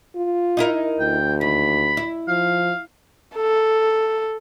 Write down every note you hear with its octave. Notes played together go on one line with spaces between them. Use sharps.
F4
D#4 E4 A#4
D2 G5
D#2 B5
E4
F3 F5
A4